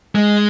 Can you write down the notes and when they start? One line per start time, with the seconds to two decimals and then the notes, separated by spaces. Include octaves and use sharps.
0.15 G#3